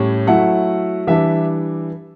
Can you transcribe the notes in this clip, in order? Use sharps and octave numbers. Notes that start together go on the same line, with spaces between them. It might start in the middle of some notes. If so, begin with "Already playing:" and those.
Already playing: A2 G3 C#4
F#3 A3 E4 F#5
E3 G3 D4 E5